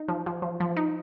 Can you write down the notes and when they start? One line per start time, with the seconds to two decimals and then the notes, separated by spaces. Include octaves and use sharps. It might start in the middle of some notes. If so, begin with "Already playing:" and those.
Already playing: D#4
0.08 F3
0.26 F3
0.42 F3
0.60 F3
0.77 D#4